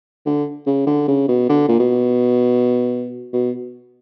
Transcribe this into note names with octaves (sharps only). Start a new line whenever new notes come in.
D3
C#3
D3
C#3
B2
D3
A#2
B2
B2